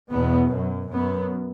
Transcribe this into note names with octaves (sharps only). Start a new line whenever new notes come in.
E2 B2 B3
F#2
F#2 B3